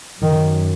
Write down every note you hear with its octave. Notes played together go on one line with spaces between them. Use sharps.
F#2 D#3